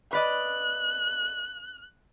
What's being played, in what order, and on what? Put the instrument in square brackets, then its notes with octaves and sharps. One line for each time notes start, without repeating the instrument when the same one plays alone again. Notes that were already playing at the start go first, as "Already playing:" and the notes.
[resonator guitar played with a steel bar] B4 D5 D#5 [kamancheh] F#6